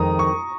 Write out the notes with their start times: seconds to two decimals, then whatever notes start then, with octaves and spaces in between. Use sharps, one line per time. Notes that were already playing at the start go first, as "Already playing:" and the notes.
Already playing: F2 D#3 G#3 A#5 D#6
0.19 C#6